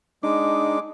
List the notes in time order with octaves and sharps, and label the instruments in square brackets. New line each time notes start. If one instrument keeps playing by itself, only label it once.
[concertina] G#3 D6 [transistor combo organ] D4 D#4